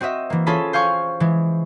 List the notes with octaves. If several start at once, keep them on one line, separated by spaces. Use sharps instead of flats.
C4 F#4 D#5 E5
E3 A#3
C#4 F4 G#4 A4 A5 B5
C5 F5 G#5 C#6
E3 G#3